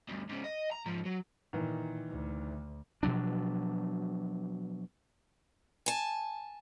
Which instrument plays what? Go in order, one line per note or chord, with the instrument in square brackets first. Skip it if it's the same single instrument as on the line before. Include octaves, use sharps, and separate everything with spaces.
[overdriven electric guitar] D2 G2
G#2 C#3
D#5
A#5
G#2 F3
F#3
[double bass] A#2 [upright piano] D#3 E3
[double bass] D2
[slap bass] B2 F3 F#3 D4
[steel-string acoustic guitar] G#5 A5